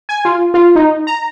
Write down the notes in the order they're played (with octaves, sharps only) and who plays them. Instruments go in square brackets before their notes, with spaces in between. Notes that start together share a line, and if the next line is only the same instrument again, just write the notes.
[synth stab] G#5
F4
F4
D#4
A#5